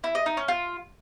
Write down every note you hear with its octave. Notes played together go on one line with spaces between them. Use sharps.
E4
D#5
D#4
C#4
F4